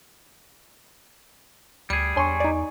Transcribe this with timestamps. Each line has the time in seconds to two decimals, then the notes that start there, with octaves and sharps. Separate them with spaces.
1.90 D2 G3 G#4 C#7
2.16 E2 D4 C#5 G#5 C6 C#6
2.40 D#4 D5